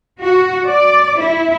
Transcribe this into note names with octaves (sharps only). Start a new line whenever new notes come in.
F#4
D5
E4